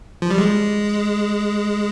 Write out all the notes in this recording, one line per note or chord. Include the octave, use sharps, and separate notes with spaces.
F3
G3
G#3